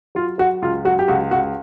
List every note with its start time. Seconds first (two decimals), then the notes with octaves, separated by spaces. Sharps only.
0.15 F#3 F4
0.38 F#3 F#4
0.62 C#2 F4
0.85 F#3 F#4
0.99 G4
1.08 C#2 F#4
1.31 C#2 F#4